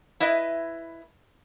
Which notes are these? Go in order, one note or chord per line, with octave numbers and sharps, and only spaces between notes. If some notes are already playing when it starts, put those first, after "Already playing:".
E4 B4 D#5 E5